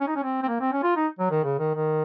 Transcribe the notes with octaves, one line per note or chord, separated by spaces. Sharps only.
C#4
D#4
C#4
C4
C4
A#3
C4
C#4
F4
D#4
F#3
D#3
C#3
D#3
D#3